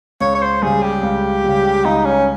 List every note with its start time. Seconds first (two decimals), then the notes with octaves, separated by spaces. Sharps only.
0.21 C#2 C#5
0.35 C#5
0.42 C5
0.63 C#3 G3 G#4
0.82 G4
1.03 C#2
1.44 C#3 G3
1.85 C#2 D#4
2.05 C#4